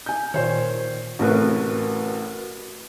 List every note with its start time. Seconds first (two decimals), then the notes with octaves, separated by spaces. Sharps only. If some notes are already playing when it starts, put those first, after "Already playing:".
0.06 G#5 G6
0.34 A#2 D#3 C5 C#5
1.19 A1 A2 C3 F#4 A#4 B4